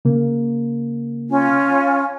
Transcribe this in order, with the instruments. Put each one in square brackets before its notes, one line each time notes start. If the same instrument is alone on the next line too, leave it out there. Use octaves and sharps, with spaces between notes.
[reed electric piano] C#3 A#3
[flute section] C#4 F4